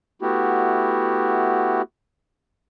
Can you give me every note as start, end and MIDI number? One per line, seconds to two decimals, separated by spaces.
0.22 1.82 57
0.22 1.82 59
0.22 1.82 64
0.22 1.82 66
0.22 1.82 67